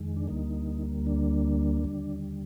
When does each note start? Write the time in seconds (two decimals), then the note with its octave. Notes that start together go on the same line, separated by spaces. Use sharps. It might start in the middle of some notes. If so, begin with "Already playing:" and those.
Already playing: F2 D#3 G#3
0.16 D4
0.28 D2 D3 G3 A#3 D#4
1.07 D4
1.84 D#2 D3 G3